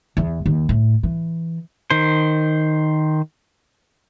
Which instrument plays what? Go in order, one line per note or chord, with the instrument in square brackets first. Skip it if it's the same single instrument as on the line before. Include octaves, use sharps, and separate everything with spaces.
[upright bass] E2
D#2
A2
E3
[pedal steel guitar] D#3 C5